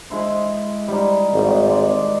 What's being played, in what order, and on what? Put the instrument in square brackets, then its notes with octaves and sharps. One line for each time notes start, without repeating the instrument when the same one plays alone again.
[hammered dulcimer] G#3 E4 C6
G3 D#4
[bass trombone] G#1
[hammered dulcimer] G#3 D5